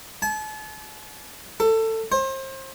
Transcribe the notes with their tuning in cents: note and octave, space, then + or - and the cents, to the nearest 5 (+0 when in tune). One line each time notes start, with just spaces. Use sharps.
A5 -40
A4 +20
C5 +35